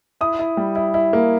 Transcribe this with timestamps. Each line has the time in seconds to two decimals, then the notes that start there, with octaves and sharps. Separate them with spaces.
0.21 E4 D#6
0.39 E4
0.57 G3
0.76 E4
0.94 E4
1.13 A#3